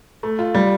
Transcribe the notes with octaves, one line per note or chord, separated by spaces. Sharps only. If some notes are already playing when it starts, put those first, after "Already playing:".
A3
F4
G3